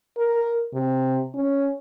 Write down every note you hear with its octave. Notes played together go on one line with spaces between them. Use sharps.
A#4
C3
C#4